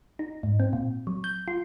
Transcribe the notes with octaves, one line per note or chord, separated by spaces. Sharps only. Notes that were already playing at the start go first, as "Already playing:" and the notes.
D#4
G#2
C4
A#2
F#3
G6
F4